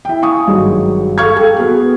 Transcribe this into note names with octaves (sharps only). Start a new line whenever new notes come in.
E4 G5
F5 G#5 C#6 D#6
G#1 G2 F#3 G#3
A4 F5 C#6 F6 G#6
A4 G5
B3 F#4 G#4